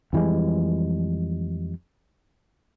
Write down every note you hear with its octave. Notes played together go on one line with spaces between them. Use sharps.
F2 E3 G3 G#3